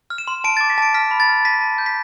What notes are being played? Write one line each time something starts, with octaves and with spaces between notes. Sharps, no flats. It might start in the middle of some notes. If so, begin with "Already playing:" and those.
F6
E7
C6
A5 D7
A6
D6
B6
A5 D7
F6 B6
B5
A6
F6
A5 B6
A5
G6
B6